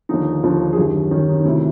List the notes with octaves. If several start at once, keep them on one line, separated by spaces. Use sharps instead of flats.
D#2 D3 F3 D#4
D#2 D3 F3
G#4
F#2 D#3 G4
F#2 D#3 C#4
D#4
D#4
D2 C3 D#3 E4